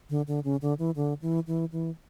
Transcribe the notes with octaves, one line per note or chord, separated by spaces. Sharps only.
D3
D3
C#3
D3
E3
D3
E3
E3
E3